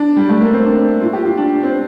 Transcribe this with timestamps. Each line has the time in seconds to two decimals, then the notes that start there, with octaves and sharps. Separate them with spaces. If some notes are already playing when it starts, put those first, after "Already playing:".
Already playing: D4
0.17 G3
0.29 A3
0.41 A#3
0.53 C4
0.65 D4
1.01 F4
1.13 G4
1.25 F4
1.37 D4
1.63 C4